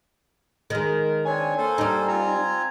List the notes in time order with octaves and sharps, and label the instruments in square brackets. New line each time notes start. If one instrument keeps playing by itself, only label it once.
[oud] D#3 G#3 [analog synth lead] A#4
[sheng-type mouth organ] C4 D4 C#5 [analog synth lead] G#5
[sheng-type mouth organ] A#3 A4 C5
[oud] G3 D#4
[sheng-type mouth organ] C4 F4 A#5